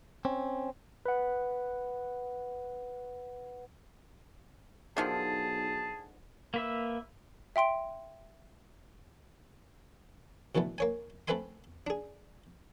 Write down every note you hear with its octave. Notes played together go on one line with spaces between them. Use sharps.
C4 C#4
B4 F#5
B1 D3 D#3 F3 G#4 A5
A#3 B4 E5
E5 G5 C6 D7
B2 D3 E3 A3 B3
A#3 C#5 G#5
A3 C4 B4 E5 G#5 C6
D4 G#4